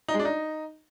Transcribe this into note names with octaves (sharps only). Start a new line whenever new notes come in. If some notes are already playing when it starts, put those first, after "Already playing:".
D#4
G#3
D4
D#4